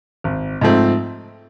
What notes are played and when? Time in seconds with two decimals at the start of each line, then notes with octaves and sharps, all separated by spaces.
0.24 G#1
0.61 G#2 F3 A3 C4